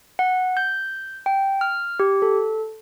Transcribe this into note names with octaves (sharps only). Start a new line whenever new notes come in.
F#5
G6
G5
F6
G4
A4